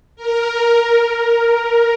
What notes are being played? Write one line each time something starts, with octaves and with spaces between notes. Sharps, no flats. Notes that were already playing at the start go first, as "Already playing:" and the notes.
A#4